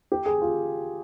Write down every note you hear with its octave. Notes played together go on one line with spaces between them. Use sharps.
G4
G#4
F4